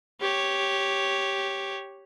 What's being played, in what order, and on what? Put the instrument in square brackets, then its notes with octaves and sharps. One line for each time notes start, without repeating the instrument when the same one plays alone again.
[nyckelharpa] G4 C#5